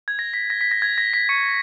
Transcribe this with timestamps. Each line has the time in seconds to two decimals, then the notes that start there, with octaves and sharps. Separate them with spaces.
0.08 G#6
0.19 A#6
0.34 B6
0.50 A#6
0.61 B6
0.71 A#6
0.82 G#6
0.98 A#6
1.13 B6
1.29 C#6 C#7